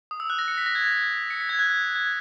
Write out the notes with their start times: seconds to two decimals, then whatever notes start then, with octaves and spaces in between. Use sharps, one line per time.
0.11 D#6
0.20 E6
0.30 F#6
0.39 A#6
0.48 C#7
0.58 B6
0.66 A#6
0.75 G#6
0.84 A#6
1.30 C#7
1.40 B6
1.49 G#6
1.59 F#6
1.95 G#6